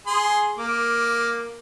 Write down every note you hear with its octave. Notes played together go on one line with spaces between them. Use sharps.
G#4 C6
A#3 D6